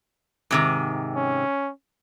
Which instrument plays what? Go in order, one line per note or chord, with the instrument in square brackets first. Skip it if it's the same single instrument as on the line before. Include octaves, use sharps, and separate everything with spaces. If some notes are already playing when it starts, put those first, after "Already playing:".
[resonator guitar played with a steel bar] G#2 C3 D#3
[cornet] C#4